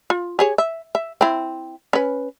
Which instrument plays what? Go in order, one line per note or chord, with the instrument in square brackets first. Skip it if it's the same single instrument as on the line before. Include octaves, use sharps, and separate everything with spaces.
[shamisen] F4
G4 G#4 C#5
E5
E5
C4 E4
C#4 B4